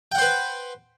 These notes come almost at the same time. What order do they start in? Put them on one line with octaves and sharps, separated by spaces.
G5 F#5 C5 B4